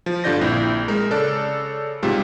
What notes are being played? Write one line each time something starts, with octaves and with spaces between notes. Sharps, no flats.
F3
G2 D3 F4 D5 G6 A#6
A#1 C4 E4
G#3 A#4
C#3 A4 D5 F#6
G#2 C3 G3 F4